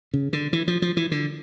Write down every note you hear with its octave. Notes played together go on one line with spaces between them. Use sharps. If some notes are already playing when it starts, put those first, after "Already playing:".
C#3
D3
E3
F3
F3
E3
D3